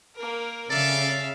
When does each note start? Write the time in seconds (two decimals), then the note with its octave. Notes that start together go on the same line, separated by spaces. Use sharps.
0.15 A#3 A#4
0.71 C#3 A4 D5 E5 F5